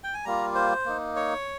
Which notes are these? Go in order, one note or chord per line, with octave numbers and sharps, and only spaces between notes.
G5
G#5
G3 A#3 F4 A#5
C5
A#3 D#4
C#5